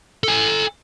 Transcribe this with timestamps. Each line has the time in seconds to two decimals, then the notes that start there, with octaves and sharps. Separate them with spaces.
0.24 A4 G#5